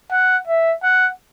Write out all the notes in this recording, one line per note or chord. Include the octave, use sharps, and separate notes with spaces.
F#5
E5
F#5